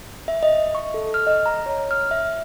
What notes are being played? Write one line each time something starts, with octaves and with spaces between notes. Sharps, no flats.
E5
D#5
C#6
A4
F6
D#5
A#5
C#5
F6
E5